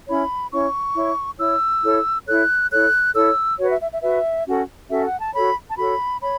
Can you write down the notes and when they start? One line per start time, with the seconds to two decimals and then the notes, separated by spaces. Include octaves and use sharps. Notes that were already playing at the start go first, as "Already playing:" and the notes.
0.07 C#4 E4 C#5 B5
0.51 C#4 E4 C#5 C#6
0.95 E4 C#5
1.39 E4 C#5 E6
1.83 E4 A4 C#5
2.26 E4 A4 C#5 F#6
2.70 E4 A4 C#5 F#6
3.15 E4 A4 C#5 E6
3.59 F#4 B4 C#5
3.69 E5
3.81 E5
3.92 E5
4.02 F#4 B4 E5
4.47 C#4 F#4 A4
4.90 C#4 F#4 A4 E5
5.05 F#5
5.19 A5
5.34 F#4 A4 C#5 B5
5.69 A5
5.78 F#4 A4 C#5 B5
6.21 C#5 B5